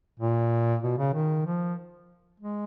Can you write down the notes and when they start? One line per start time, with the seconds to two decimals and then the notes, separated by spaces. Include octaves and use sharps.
0.20 A#2
0.82 B2
0.98 C#3
1.14 D#3
1.46 F3
2.40 G#3